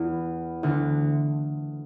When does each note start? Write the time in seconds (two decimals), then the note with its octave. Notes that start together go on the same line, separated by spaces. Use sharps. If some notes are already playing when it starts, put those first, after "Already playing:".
Already playing: E2 E3
0.63 D2 D3